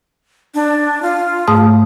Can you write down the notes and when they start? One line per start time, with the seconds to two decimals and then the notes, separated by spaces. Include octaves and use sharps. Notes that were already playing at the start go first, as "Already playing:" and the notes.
0.54 D4
1.02 F4
1.48 G#2 A3 D#6